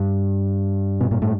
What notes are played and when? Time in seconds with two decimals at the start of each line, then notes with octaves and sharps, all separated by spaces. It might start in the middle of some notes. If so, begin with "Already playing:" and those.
Already playing: G2
1.00 B2
1.11 A#2
1.22 A2